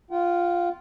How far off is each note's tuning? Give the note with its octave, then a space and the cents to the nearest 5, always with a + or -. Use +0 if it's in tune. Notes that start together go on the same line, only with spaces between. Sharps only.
F4 +0 G5 -45